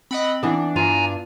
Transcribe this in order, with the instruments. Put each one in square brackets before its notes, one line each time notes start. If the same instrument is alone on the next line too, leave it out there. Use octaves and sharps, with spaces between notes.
[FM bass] C4 [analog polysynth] D#5 F#5 B5
[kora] E3 B3 [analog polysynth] D4
[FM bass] G2 [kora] F4 [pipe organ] G#5 A#5